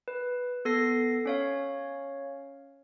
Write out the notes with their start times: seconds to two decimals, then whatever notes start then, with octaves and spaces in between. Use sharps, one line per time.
0.08 B4
0.65 B3 A4 A#6 C7
1.26 C#4 C#5 F5